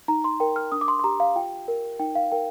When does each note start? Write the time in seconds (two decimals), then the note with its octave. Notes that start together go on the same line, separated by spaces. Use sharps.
0.08 D#4 A#5
0.24 C6
0.40 A#4 G5
0.56 F6
0.72 D4 D#6
0.81 D6
0.88 C6
0.99 C6
1.04 G4 A#5
1.20 F5
1.36 F4 G5
1.68 A#4
1.99 D#4 G5
2.15 F5
2.32 A#4 G5